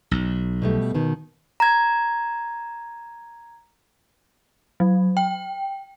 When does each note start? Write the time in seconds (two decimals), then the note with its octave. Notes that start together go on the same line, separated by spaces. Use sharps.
0.11 B1
0.62 B2 G3 A3
0.95 B2 D#3
1.60 A#5 G#6
4.80 F#3
5.17 G5